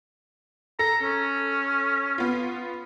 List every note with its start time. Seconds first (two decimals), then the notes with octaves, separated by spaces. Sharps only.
0.79 A4 A#5
1.03 C#4
2.18 B3 F4